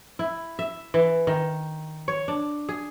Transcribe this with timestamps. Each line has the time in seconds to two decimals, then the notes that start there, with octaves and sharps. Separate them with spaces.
0.19 E4
0.59 E5
0.94 E3
1.27 D#3
2.08 C#5
2.28 D4
2.69 G#4